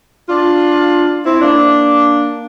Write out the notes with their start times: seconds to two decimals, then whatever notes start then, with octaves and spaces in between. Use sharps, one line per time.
0.29 D4 F4
1.25 C4 E4
1.40 A#3 D4